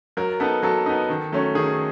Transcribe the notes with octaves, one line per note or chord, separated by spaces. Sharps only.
F#3 A#4
B3 D#4 A4
F#3 A4
B3 D#4
D#3
F#3 A3 C#4
D#3 G#4